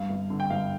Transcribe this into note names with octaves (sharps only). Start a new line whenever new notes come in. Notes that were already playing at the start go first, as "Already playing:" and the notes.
Already playing: G2 F5
G1
D3
G5
G1 F5